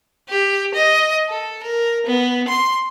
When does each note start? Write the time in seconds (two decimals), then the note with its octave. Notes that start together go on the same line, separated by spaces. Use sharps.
0.29 G4
0.74 D#5
1.29 A4
1.63 A#4
2.06 B3
2.48 C6